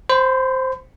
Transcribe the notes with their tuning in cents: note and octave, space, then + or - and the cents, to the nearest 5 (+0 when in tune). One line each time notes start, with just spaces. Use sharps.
C5 +0 B5 +40